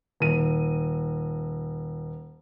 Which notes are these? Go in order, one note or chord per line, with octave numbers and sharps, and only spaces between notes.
D#1 D#7